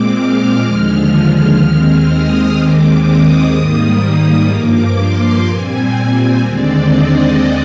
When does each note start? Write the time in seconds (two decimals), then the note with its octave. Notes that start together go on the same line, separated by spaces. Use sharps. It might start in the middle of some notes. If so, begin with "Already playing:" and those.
Already playing: A#2 G#3 C4 D6
0.14 F6
0.61 D#2 D3 F3 G#3 F6
1.58 D#2 D#3 G#3 C4
2.07 D#6
2.55 D#2 D#3 G#3 C4 D6
3.03 D#6
3.52 G#2 D#3 G3 A#3 D#6
4.00 D#6
4.49 G2 F3 A#3 D6
4.97 C6
5.45 A#2 G3 C4 G#5
6.41 D#2 D3 G#3 C4 D5
6.90 D#5